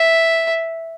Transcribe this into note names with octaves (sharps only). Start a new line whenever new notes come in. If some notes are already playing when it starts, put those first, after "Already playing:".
Already playing: E5